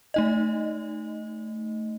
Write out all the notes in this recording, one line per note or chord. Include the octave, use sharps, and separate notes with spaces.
A3 D#4 D#5